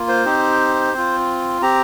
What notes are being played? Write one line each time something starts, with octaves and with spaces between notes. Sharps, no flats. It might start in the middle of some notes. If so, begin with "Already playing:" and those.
Already playing: A#3 F4
C5
C4 D#4 G4
C4 F4
C4 G4 A#5